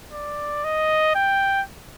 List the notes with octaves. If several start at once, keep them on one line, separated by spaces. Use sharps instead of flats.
D5
D#5
G5